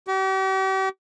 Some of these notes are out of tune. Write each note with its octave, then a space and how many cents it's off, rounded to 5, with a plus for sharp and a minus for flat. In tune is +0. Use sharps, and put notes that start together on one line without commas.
G4 -40